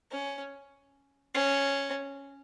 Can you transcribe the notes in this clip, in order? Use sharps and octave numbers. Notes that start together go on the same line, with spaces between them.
C#4
C#4